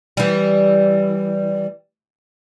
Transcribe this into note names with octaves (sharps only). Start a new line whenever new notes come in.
E3 G3